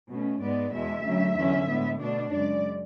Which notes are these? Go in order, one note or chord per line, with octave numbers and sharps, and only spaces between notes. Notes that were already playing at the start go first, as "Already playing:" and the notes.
B2 A3 C#4
G#2 G#3 B3 D5
E2 B2 G#3 E5
D2 C#3 F#3
E2 D3 F#3 C#4
A2 G#3 B3
B2 A3 D4 D5
F#2 C#3 G#3 D5